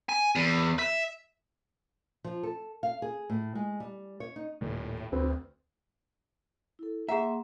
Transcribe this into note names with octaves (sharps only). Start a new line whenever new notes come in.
G#5
E2
E5
F3
A4
F5
G#4
A2
G#3
G3
C#5
D#4
D#1 A2
D2 C4 B4
E4 A4
A#3 G#4 E5 F#5 A#5 C6